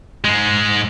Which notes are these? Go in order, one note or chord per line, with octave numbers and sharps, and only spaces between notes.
G#2 G#3